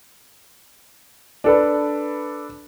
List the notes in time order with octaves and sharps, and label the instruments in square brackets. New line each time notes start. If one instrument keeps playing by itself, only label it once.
[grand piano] D4 A4 B4